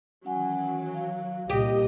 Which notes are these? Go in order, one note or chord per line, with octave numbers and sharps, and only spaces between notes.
D#3 E3 F#3 C#4 F#5 G#5
F5
C2 A#2 G4 D#5 D#6